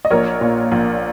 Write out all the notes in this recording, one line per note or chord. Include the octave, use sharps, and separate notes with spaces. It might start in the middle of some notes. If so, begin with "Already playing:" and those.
D#5
A#1 A#4 C#5
A#2
A#1